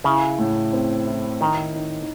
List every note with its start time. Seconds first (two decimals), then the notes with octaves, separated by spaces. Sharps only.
0.04 C#3 E4
0.39 A2
0.73 C4
1.07 E4
1.41 D#3 D#4
1.75 D#4